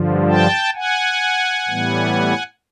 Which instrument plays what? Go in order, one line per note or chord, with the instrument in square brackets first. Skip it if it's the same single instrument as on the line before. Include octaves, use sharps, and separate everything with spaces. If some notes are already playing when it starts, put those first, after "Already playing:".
Already playing: [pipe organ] G2 D3 F3
G5 A5
F#5 G#5
A2 E3 G3 B3